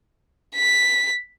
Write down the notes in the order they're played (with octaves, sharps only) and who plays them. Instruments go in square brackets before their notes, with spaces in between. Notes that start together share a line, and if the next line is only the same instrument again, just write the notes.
[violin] B6